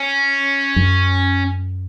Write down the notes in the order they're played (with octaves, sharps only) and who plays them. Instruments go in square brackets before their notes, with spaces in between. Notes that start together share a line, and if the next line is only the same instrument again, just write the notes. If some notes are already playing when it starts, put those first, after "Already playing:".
Already playing: [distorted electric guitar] C#4
[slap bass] F#2